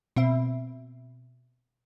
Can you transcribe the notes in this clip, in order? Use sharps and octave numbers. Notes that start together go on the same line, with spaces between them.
B2 C4 E5